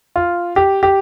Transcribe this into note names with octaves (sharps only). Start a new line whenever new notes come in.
F4
G4
G4